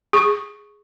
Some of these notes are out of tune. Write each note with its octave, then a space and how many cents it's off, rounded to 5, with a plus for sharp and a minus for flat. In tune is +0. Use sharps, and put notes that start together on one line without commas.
G#4 +0 C#6 -5